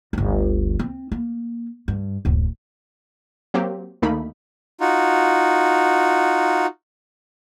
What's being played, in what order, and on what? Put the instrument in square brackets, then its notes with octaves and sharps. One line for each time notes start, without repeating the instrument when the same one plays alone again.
[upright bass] G1 D2
C4
A#3
G2
D1 F#2
[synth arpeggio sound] F#3 A#3 C4 G4
D2 D#3 A3 A#3 D#4 B5
[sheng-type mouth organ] D#4 F4 F#4